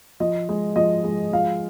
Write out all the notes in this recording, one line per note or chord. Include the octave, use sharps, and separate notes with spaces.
F3 D#5
G#3
F3 D#5
G#3
F3 F5